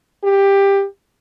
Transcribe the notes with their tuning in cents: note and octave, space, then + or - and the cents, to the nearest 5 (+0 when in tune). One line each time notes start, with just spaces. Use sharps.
G4 +15